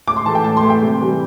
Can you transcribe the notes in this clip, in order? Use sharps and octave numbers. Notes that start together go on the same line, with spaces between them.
A2 D6
C6
E3 A3 A5
G5
A2 A5
C6
E3 A3
G5
C3
E3 G3